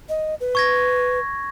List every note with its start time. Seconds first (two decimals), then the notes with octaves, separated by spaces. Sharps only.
0.09 D#5
0.41 B4
0.55 C#6 G#6 A#6